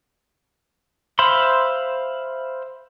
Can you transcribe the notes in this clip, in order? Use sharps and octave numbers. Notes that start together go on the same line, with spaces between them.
C5 E5 F5 B5 C6